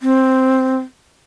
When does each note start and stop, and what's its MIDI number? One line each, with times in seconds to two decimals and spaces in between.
0.01 0.77 60